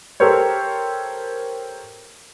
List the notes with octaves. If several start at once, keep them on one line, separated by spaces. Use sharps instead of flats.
G4 A4 A#4 C5 C#5